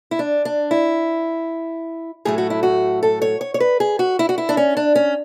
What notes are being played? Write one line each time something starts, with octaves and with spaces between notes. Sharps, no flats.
E4
D4
D4
E4
A2 F#3 A3 G#4
F#4
E4
F#4
A4
C#5
C#5
C#5
B4
G#4
F#4
E4
F#4
E4
D4
C#4
D4
C#4